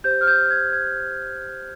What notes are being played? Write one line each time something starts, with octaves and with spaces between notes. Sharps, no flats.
G4 C5 G6
F6
G6
G#6
G#6